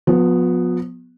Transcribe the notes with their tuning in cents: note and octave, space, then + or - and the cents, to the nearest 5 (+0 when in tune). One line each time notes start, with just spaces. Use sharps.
F3 +40 B3 +0